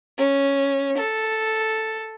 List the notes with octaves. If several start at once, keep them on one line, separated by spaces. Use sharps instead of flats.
C#4
A4